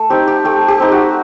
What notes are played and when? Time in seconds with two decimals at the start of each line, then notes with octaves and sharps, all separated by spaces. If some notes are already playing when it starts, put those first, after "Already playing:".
Already playing: A3
0.10 C4 D#4 G4
0.27 G4
0.45 A3 G4
0.68 G4
0.80 C4 D#4
0.92 F#4